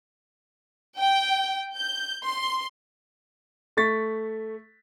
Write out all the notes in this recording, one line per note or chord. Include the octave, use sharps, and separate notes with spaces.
G5
G6
C6
A3 C#6 A6 B6